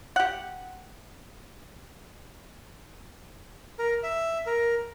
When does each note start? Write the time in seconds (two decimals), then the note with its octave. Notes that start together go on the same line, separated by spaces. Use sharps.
0.16 G4 F#5
3.79 A#4
4.03 E5
4.46 A#4